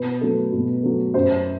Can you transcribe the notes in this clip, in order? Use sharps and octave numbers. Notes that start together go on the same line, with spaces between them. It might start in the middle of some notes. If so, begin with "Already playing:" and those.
Already playing: B2 B4
F#3 A3
B2
F#3 A3
F#2 C5